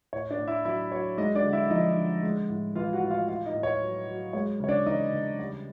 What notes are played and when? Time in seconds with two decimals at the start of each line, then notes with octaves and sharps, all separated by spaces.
0.13 A2 C#5
0.31 D4 D5
0.39 A2
0.48 E4 E5
0.65 F#3 E4 E5
0.92 F#3 C#5
1.17 G#3 D#4 D#5
1.35 D4 D5
1.44 D3
1.53 E4 E5
1.70 F3 D#4 D#5
1.97 D3
2.23 G#3
2.49 A2
2.76 E3 F4 F5
2.93 F#4 F#5
3.02 A2
3.10 F4 F5
3.28 A2 F4 F5
3.46 D#4 D#5
3.54 A2
3.63 C#5
3.81 F#3
4.08 F#3
4.33 G#3 C#5
4.60 C#3 C#5
4.69 D4 D5
4.86 E3 D#4 D#5
5.12 C#3
5.39 G3